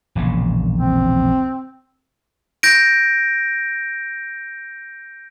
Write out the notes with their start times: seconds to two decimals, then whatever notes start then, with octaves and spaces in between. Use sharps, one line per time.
0.15 E1 A#1 C#3
0.79 C4
2.63 G6 A#6 D7